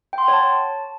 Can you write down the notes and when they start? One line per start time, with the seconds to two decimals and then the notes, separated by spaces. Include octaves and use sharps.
0.13 G5
0.18 C6
0.23 F#5
0.28 C#5
0.33 A5